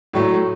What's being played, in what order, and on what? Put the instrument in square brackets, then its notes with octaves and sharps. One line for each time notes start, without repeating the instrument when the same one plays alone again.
[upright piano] A2 F#3 A3